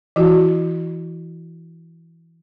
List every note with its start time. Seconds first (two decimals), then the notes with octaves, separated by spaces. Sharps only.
0.16 E3 E4 F#4